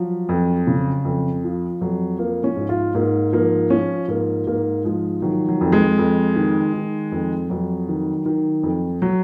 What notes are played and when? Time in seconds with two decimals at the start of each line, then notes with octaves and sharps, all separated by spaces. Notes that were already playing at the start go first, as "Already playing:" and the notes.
Already playing: F3 F#3
0.29 F2
0.67 C#3
1.05 F2
1.44 F3
1.81 F2 F#3
2.18 F3 A#3
2.44 C#4
2.57 G#2
2.69 F4
2.95 G#2 A#3
3.32 F3 A#3
3.70 F3 C#4
4.08 G#2 A#3
4.47 G#2 A#3
4.85 F3 G#3
5.22 D#3 F#3
5.48 F#3
5.61 F2
5.72 G#3
5.98 F2
6.36 D#3
6.74 D#3
7.12 F2
7.49 F2 F#3
7.88 D#3
8.25 D#3
8.63 F2
9.02 F#3